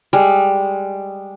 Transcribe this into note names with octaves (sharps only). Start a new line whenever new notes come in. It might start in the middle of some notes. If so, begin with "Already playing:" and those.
G3 G#3